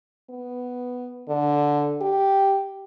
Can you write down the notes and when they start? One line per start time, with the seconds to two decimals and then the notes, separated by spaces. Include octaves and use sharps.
0.30 B3
1.29 D3
2.01 G4